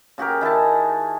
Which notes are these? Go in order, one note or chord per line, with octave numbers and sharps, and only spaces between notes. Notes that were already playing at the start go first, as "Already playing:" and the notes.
C#3 F#4 G4 A#4
D#3 E4 G#4 A5